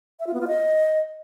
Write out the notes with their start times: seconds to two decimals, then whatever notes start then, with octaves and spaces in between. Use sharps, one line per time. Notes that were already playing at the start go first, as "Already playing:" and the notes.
0.20 E5
0.26 F4
0.33 B3
0.40 F4
0.47 D#5